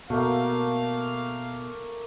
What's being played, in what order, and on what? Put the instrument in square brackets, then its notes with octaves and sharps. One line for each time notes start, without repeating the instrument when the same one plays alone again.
[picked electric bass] B2 [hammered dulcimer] A3 A#3 [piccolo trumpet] F5